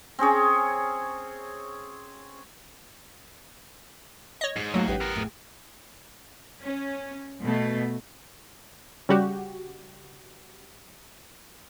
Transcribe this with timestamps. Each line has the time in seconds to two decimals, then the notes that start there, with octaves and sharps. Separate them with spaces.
0.19 C4 C#4 G#4 C#5
4.41 C#5 D#5
4.56 G#2 G#4
4.74 F#3 A3 A#3 F#4
4.88 A1 G4 B4 F#5
5.01 B3 A#4
5.16 A2 G#4
6.61 C#4
7.42 B2 A3
9.09 C#3 G3 F#4 G4